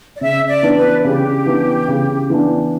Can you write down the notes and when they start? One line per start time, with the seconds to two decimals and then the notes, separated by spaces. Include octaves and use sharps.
0.15 D5
0.21 C#3 E5
0.48 D5
0.63 E3 B3 D4
0.76 B4
1.04 C#3 G4
1.46 E3 B3 D4
1.88 C#3
2.30 E3 B3 D4